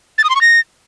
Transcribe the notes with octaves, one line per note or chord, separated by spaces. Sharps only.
A6
D#6
C6
C#6
A#6